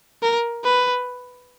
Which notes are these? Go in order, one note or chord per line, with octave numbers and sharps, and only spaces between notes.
A#4
B4